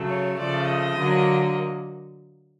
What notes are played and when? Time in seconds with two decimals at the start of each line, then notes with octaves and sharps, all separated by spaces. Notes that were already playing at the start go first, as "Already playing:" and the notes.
Already playing: C#3 F#3 A3
0.08 C#5
0.39 C#3 F3 A3 D5
0.69 D#5
0.99 D3 F#3 A#3